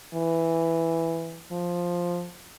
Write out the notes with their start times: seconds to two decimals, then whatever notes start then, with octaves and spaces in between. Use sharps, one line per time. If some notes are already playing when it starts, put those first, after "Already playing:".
0.14 E3
1.52 F3